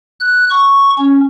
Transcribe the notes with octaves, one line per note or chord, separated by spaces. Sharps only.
F#6
C#6
C#4